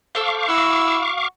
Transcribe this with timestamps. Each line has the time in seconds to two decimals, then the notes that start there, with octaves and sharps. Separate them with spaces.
0.15 A4 C5 F5 C#6 D6
0.48 E4 F#4 E6